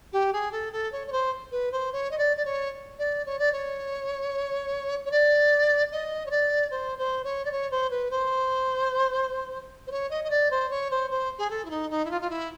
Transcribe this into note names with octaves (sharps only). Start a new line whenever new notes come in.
G4
G#4
A4
A4
C#5
C#5
C5
B4
C5
C#5
D#5
D5
D5
C#5
D5
C#5
D5
C#5
C#5
D5
D#5
C#5
D5
C5
C5
C#5
D5
C#5
C5
B4
C5
C5
C#5
D#5
D#5
D5
C5
C#5
C5
C5
G#4
A4
E4
D#4
D#4
E4
F4
F4
E4